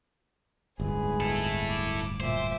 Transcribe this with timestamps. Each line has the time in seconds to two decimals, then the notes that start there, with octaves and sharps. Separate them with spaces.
0.80 D1 G1 G#2 G#4 B4
1.20 E4 A4
1.71 D6
2.20 A#2 C5 E5 D6